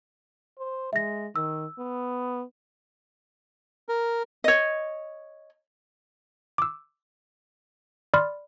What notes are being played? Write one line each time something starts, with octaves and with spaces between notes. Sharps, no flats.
C5
G#3 E5 A#6
D#3 E6
B3
A#4
C#5 D#5
D6 E6
D5 B5 C6 F6